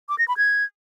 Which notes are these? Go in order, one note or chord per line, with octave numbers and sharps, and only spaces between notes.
D6
A#6
B5
G#6